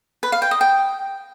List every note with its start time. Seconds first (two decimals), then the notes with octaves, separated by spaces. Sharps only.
0.23 B4
0.32 F5
0.42 G5
0.51 D#5
0.61 G5